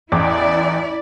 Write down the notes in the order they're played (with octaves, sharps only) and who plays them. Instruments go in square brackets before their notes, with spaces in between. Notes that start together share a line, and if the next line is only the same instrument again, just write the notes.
[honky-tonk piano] A1 E2 D6 [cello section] E4 D5